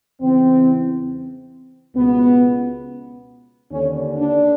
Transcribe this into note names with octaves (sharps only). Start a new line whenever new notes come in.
E2 C#3 E3 C4
C#2 B2 B3
D#2 D3 C#4
D4